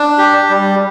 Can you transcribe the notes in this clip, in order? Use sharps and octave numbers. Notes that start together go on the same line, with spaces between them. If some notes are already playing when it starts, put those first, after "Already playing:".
Already playing: D4
G4
G3